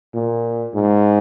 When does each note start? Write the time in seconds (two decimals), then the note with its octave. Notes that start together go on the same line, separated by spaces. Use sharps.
0.14 A#2
0.74 G#2